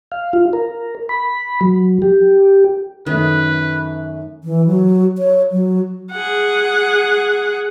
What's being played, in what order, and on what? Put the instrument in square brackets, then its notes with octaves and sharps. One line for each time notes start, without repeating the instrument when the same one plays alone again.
[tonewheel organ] F5
F4
A#4
B5
F#3
G4
[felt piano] F#2 A3 [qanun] D#3 [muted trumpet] B4
[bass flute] E3
F#3
C#5
F#3
[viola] G#4 F#5